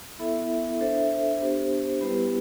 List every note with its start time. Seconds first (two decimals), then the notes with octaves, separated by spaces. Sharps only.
0.19 B3 E4 A4 E5
0.80 D4 A4 C5 E5
1.41 B3 D4 G4 C5
2.01 G3 B3 E4 G4 B4